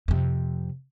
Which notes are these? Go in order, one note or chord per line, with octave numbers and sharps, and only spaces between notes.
F2 C3